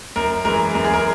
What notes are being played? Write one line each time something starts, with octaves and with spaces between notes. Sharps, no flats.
F#2 A#4
E3 G#3 A#4
F#2 A#4
G#4
A#4